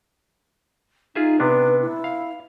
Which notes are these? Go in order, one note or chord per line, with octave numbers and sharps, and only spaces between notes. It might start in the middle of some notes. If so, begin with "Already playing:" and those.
D#4 F4 G#4 E5
C3 B3 D4 B4
E4
F5